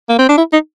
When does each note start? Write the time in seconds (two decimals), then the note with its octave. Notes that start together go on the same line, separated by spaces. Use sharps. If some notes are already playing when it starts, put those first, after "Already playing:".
0.09 A#3
0.19 C4
0.29 D4
0.38 E4
0.53 D#4